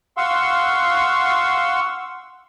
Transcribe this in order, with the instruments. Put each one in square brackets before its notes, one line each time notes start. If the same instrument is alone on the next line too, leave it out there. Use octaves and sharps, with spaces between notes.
[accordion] F5 F#5 C6 C#6 E6